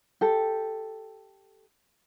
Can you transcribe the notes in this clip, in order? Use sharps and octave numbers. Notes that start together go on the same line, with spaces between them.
G4 A4